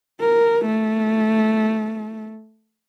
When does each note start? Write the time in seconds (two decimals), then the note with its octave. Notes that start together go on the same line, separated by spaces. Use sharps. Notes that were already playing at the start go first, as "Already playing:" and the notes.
0.20 A#4
0.65 A3